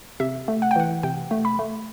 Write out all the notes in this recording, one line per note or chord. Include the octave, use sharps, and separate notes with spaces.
C3 E5
A3
F#5
G5
E3 F#5
C3 G5
A3
B5
A3